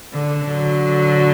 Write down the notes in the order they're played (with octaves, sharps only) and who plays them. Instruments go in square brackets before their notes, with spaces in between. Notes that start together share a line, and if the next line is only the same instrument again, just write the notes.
[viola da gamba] D3
D3 F#3